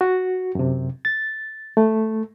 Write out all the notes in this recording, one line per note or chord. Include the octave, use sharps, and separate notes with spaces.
F#4
F#2 C3
A6
A3